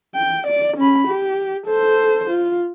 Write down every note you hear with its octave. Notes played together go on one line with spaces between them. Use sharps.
G5
D5
C#4 B5
G4
A4 C5
F4